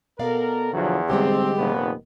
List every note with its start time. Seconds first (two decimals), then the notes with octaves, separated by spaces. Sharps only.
0.19 B2 B3 A4 A#4 D5 F5
0.73 E2 D3 F3 F#3
1.10 A1 G#2 D3 G3 G#3 C4 G4
1.57 F1 A#2 D#3 B3